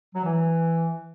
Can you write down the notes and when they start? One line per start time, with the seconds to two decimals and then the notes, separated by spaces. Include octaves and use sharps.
0.15 F#3
0.25 E3